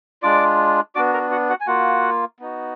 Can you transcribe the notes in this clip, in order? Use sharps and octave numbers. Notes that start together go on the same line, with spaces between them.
G#3 D4 F4 D5 D6
B3 D4 F#4 D5 D6
A#4 A#5
F#4 F#5
F#4 F#5
G#5
A#3 F4 F#4 F#5
B3 D#4 F#4